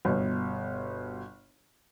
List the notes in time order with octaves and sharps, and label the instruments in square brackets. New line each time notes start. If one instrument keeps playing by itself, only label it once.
[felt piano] G1 B2